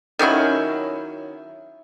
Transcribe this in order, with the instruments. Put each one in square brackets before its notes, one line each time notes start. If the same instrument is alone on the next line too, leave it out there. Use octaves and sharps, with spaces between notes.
[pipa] D#3 F#3 C#4 E4